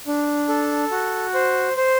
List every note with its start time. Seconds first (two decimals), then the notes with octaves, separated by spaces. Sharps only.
0.07 D4
0.49 A4
0.91 F#4
1.34 C5
1.77 C5